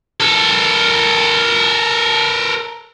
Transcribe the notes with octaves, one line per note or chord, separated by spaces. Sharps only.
A4 A#4